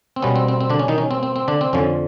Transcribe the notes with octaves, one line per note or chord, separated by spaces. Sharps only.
C4
B2 G3 B3 C#4
C4
C4
C4
D3 D4
C#4
D#3 D#4
C#4
C4
C4
C4
D3 D4
C4
F2 D3 F3 C#4